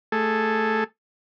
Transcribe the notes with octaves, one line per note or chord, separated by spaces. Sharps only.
A3 G#4 A4